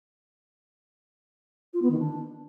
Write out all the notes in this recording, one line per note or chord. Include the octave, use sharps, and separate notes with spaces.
F4
B3
D#3
D4